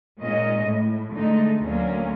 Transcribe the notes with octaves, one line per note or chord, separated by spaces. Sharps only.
A#2 G#3 C#4 D#4 D#5
A2
D3 G#3 A3 D#4
D2 F#3 A#3 C#4